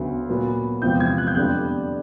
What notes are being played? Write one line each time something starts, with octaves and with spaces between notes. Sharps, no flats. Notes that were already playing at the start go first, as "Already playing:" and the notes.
Already playing: D2 C#3 F#3 B3
A#2 F#3 B3
E2 C3 F3 G#3 C4 G6
G#6
F#6
G6
F2 D3 G3 B3 D4 F#6